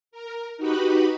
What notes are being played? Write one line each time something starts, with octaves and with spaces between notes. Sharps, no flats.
A#4
D#4 F#4 G4 B4 B5